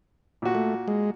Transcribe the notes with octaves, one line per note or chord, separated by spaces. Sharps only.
A#2 F#4
A3
G#3